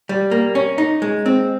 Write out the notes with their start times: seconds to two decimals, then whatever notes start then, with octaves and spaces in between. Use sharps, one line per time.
0.09 G3
0.31 A#3
0.55 C#4
0.78 D#4
1.02 G#3
1.26 C4